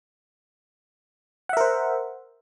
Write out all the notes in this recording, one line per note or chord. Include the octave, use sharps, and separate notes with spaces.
A#4 C5 E5 F#5